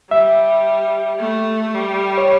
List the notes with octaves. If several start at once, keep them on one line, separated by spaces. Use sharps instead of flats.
G3 E5
A3
G3
C#5